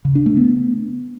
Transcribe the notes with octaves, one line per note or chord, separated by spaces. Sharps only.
C#3
D4
A3
B3